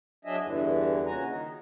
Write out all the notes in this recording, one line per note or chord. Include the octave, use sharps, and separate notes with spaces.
F#3 D4 G#4 D#5 E5
E2 G2 D3 E3
A#2 C#3 F#4 G#5 A#5
D#3 D#4